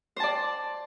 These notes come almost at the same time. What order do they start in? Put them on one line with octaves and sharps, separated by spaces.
C5 A5 D5